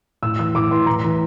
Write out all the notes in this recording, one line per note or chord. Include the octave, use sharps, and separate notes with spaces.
A2 E6
E3 E6
A2 D6
E3 C6
A2 A#5
E3